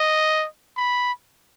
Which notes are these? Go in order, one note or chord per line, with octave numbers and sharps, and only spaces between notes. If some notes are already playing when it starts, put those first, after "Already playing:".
Already playing: D#5
B5